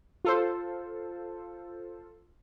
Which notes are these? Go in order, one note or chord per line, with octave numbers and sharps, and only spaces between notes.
F4 A4 C5